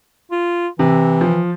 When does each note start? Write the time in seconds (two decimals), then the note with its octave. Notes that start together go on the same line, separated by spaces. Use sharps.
0.31 F4
0.79 C3 E3
1.21 F3